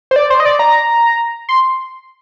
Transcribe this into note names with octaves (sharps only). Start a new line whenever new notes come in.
C5
D5
C5
D#5
D5
A#5
C6